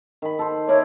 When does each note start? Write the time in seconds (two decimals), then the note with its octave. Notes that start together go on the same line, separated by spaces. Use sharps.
0.22 D#3 B5
0.39 A4 C5
0.68 E4 A#4 C#5 D5